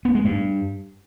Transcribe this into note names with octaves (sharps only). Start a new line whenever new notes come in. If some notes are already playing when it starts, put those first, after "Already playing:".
B3
G#3
G2